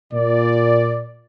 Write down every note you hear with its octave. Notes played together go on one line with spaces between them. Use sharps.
A#2 D5